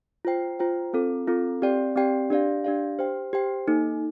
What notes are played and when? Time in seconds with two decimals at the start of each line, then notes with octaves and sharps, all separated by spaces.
0.25 F4 C5 G5
0.59 F4 C5 G5
0.93 C4 F4 A4
1.27 C4 F4 A4
1.62 C4 G4 D5 G5
1.96 C4 G4 D5 G5
2.30 D4 G4 D5 F5
2.64 D4 G4 D5 F5
2.99 G4 C5 G5
3.33 G4 C5 G5
3.67 A#3 D#4 A4